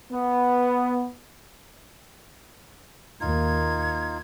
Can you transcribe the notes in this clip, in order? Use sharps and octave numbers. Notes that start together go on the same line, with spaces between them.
B3
D#2 A#3 D#4 F4 G#6